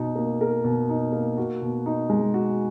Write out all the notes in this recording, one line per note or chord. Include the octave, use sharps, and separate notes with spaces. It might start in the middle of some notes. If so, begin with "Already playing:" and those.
Already playing: B2 D#4
A#3
A#4
B2
D#4
A#3
F#4
B2
D#4
G#3
F#4